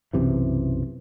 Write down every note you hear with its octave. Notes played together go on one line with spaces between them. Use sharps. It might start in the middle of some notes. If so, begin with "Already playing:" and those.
B1 F#2 C3 E3